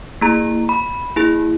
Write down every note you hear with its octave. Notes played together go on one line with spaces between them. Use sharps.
A#3 E4 G#4 A#5
B5
A#3 E4 G#4